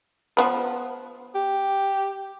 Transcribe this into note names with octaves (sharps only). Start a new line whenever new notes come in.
F3 B3 B4
G4